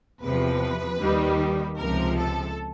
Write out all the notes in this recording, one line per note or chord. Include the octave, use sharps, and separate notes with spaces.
E2 C3 F3 B4
D#2 D#3 G3
C#2 C3 F3 A#4
A4